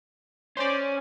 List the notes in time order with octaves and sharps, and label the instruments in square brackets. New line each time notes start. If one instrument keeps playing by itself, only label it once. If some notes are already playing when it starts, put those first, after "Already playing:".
[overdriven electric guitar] C#4 [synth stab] C5 D5